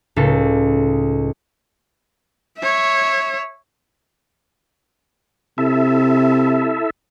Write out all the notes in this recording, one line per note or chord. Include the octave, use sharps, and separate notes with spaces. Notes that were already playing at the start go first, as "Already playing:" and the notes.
C#2 A2 D#4 A4
C#5 E5
C3 E4 A4 E5